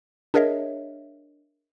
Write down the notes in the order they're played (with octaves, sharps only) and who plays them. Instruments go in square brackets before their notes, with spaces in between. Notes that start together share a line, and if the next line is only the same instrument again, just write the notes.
[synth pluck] D4 G#4 A#4 C#5 D#5 E5